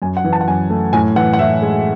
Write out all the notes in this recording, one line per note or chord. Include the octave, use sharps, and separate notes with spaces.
F#2 G#5
F#5
E3
A5
F#5
F#2 G#5
A3
A2 G#5
E3 F#5
F#5
A2 E5
G#3